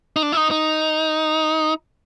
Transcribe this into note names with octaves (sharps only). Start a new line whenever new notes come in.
D#4
D4
E4
D#4
D#4